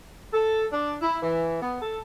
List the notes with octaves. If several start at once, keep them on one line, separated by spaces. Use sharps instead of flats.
A4
D4
E4
E3
B3
A4